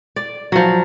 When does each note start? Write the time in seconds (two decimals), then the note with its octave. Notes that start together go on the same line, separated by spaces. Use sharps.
0.16 D5
0.52 F3 F#3